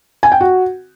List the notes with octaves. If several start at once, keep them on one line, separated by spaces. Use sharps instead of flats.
G#5
G5
F#4